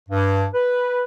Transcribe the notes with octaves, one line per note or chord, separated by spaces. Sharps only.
G2
B4